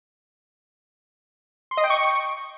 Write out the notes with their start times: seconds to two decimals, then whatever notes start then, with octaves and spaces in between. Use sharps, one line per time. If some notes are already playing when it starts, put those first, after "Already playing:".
1.71 C6
1.77 D#5
1.84 G5
1.90 C#6